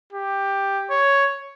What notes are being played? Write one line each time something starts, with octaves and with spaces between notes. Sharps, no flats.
G4
C#5